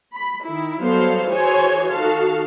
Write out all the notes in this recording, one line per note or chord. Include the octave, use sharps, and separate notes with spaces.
B5
D#3 E4
F#3 G3 B3 A4 C5 F5
E3 F#4 G#4 C5 C#5 G#5
D#3 F#4 A4 F5 A5